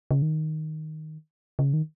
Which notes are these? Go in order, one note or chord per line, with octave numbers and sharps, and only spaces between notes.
C#3
D#3
C#3
D#3